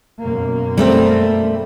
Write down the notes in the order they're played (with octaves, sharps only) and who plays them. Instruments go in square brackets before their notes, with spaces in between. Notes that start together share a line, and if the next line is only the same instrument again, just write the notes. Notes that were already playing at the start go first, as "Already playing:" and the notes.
[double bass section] F#2 B2 A#3
[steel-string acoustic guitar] G3 A3 C4